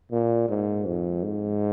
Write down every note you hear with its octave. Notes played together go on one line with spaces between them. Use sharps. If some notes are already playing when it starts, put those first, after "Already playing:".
A#2
G#2
F2
G#2